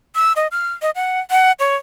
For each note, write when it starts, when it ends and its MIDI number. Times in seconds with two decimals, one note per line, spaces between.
0.16 0.33 88
0.36 0.47 75
0.51 0.72 89
0.82 0.90 75
0.95 1.20 78
1.31 1.52 78
1.59 1.75 73